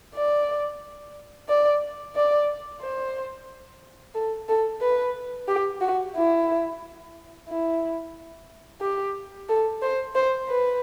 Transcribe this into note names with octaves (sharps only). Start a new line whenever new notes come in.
D5
D5
D5
C5
A4
A4
B4
G4
F#4
E4
E4
G4
A4
C5
C5
B4